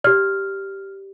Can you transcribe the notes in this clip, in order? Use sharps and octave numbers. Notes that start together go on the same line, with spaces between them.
G4 D5 F6